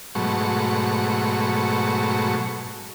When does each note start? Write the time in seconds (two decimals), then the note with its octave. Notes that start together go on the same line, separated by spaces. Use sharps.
0.15 G#2 B2 F#3 A3 C#6